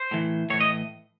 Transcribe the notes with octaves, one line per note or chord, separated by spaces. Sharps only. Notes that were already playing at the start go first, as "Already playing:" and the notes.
Already playing: C5
A2 E3
A2 E3 C#5
D#5